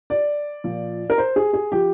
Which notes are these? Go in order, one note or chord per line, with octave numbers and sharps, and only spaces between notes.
D5
A#2 F3
A#4
C5
G#4
G#4
F3 G4